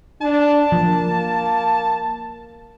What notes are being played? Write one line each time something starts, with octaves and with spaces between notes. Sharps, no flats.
D4 A5
F3 A#3